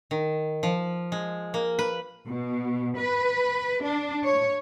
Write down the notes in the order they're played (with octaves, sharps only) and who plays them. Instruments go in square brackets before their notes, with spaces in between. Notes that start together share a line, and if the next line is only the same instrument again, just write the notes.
[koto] D#3
F3
G#3
A#3
B4
[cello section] B2
B4
D4
C#5